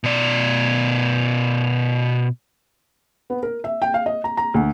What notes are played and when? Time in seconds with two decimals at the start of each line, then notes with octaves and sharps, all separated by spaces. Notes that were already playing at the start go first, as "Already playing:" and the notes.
0.04 B2 D5
3.30 B3
3.43 A#4
3.64 E5
3.82 G5
3.94 F5
4.06 D#5
4.24 A#5
4.37 A#5
4.54 D2